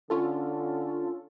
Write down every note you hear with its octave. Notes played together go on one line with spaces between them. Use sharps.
D3 C#4 F4 A4